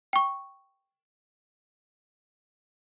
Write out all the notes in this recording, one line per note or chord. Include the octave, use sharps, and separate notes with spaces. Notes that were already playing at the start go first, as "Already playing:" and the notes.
G5 C#6